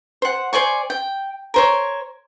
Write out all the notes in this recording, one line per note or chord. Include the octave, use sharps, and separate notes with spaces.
C5 F#5
C5 D5 G#5 C#6
G5
A#4 C5 C#5